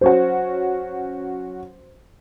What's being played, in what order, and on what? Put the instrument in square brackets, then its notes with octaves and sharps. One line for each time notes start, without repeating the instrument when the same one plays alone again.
[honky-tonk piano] F#3 C#4 F#4 [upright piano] C5